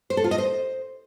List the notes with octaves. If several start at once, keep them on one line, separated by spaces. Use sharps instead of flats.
C5
A4
F4
D#5
C5